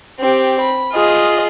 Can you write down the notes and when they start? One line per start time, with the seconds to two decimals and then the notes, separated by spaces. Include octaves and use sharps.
0.19 C4 G4
0.61 B5
0.93 F4 G#4 D#5